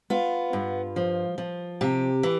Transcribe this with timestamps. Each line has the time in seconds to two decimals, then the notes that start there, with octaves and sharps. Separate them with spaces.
0.10 B3 F4
0.53 G2
0.96 F3
1.38 F3
1.81 C3 G4
2.23 E3